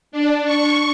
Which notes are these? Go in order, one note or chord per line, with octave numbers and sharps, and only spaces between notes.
D4
C#6